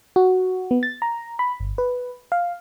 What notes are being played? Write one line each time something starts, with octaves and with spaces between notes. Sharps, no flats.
F#4
B3
A6
A#5
B5
G1
B4
F5